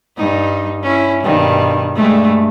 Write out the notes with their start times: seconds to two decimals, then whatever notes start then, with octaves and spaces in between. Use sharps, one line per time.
0.18 G2 D#4
0.83 C#4 E4
1.22 G2 B2 D#3
1.95 G2 G#3 A3